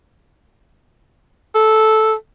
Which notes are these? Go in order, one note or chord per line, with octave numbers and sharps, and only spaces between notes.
A4